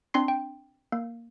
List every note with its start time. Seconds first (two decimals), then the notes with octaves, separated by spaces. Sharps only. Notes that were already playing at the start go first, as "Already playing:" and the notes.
0.14 C4 D4 C6 C7
0.28 G5
0.92 A#3